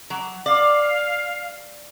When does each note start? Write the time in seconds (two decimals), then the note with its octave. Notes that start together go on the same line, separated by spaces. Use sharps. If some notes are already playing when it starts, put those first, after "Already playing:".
0.10 F#3
0.46 D5 F5